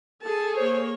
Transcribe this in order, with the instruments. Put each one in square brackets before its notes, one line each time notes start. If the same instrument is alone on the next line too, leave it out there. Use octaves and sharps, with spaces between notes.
[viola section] G#4 A4 [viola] A5
[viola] A#3 C#5 [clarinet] C5